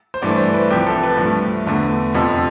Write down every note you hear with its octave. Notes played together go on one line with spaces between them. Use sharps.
C5
G2 E3 A3 D5
C5
B4
C2 C3 F3 G4
A4
B4
G2 F3 A3
E2 D3 A3
F2 C3 F3 A4